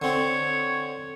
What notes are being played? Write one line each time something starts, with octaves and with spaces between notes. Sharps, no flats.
D3 C4 C#5